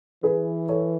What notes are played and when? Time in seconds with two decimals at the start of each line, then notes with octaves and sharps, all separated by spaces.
0.23 E3 G#4 B4
0.69 A4 C#5